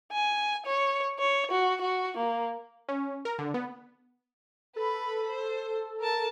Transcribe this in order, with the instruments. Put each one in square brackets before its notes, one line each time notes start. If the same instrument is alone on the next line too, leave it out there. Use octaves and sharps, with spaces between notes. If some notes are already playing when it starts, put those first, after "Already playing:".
[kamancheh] G#5
C#5
C#5
F#4
F#4
A#3
[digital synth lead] C#4
A#4
D3
B3
[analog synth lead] A4 [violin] B4 B5
[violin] C5
A#4 A5